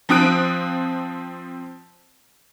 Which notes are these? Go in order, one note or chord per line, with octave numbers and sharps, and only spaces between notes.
F3 C4 D#6 F#6 D7